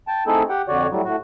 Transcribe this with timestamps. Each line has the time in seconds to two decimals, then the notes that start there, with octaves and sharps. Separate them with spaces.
0.08 G5 A5
0.27 A3 C4 D#4 E4 G#4 A4
0.49 G4 F#5 G5
0.68 F2 D3 F#4 C#5 D5
0.90 A2 F#3 G3
1.05 A2 F#4